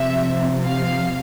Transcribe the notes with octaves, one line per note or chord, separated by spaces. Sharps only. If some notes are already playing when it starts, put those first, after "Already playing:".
Already playing: C3 F3 E5
F5